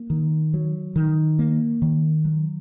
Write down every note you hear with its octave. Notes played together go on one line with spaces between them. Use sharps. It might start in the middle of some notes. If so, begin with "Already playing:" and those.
Already playing: A#3
D#3
F#3
D#3
A#3
D#3
F#3